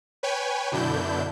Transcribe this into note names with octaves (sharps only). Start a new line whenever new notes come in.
B4 C#5 G5 G#5
F#2 B2 D3 D4 E4 G6